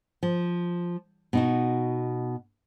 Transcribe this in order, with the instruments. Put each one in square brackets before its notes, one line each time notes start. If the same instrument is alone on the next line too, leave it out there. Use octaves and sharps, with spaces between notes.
[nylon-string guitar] F3
B2 D#4 F#4